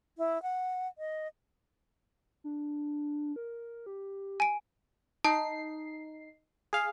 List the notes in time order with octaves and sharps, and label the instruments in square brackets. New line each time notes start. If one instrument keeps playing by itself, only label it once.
[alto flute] E4
F#5
D#5
[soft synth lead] D4
A#4
G4
[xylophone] G#5 D7
[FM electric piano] D#4 C7 [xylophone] A5
[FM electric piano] G#4 F5